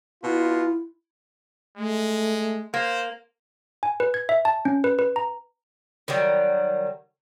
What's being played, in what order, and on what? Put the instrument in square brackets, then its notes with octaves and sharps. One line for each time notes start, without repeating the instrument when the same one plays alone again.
[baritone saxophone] B2 [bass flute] E4 [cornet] F4
[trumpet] G#3 [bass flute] A3
[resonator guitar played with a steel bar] A#3 [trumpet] C5
[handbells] G#5
B4
G#6
E5
A5
C#4
B4
B4
A#5
[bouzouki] D#3 F#3 G3